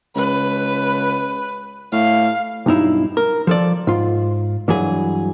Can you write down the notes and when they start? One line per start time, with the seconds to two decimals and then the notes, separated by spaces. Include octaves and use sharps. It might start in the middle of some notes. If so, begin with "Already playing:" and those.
0.16 C#2 B4
1.92 A2 F5
2.66 B1 G2 D#4 E4
3.17 A#4
3.47 F3 A4 D5
3.87 G#2 F4
4.68 G2 E3 F#3 G#4